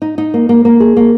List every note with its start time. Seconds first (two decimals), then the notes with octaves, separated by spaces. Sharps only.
0.02 D#4
0.18 D#4
0.34 A#3
0.49 A#3
0.65 A#3
0.80 G#4
0.97 A#3